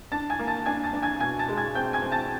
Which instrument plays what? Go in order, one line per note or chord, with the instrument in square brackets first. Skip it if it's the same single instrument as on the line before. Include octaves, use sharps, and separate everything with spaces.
[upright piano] D4 A5 A6
G#5 G#6
A#3
A5 A6
D4 G#5 G#6
A5 A6
D4
G#5 G#6
B2 G#5 G#6
A5 A6
G#3
G#5 G#6
C4 G5 G6
G#5 G#6
C4
A5 A6